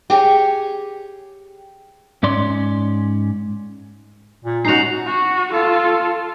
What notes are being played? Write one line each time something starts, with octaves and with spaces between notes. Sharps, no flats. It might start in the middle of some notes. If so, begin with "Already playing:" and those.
G4 G#4 C#5
G#2 C#4 D5 C6
A#2
C#4 D#4 F#4 C7 F7
F#4
F4 A4